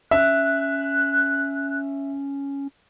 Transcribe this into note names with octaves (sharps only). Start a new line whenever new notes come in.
C#4 E5 F#6